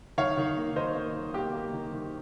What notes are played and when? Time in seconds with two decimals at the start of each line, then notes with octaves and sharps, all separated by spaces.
0.18 D#3 C#5 F5
0.37 D#3
0.57 A#3
0.76 D#3 C5 D#5
0.95 A#3
1.15 D#3
1.34 A#3 G4
1.53 A#3
1.73 D#3
1.92 D#3